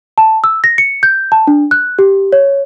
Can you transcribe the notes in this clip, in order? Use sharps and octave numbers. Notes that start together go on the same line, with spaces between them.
A5
E6
A#6
C#7
G6
A5
D4
F#6
G4
C#5